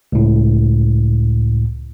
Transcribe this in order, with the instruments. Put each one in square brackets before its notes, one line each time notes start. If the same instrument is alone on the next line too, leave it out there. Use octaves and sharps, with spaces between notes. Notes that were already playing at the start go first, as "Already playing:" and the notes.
[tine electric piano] C#2 A2